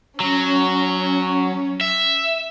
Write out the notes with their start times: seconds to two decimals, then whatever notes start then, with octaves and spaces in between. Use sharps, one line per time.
0.20 F#3 C#4
1.81 E5